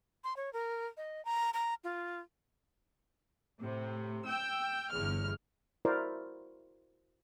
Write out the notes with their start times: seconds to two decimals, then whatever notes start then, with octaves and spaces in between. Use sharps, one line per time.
0.24 C6
0.37 C#5
0.53 A#4
0.97 D#5
1.25 A#5
1.54 A#5
1.84 F4
3.60 A2 C3
4.25 G5 E6
4.90 G1 E2 F6
5.85 E4 F#4 A#4 C5 D5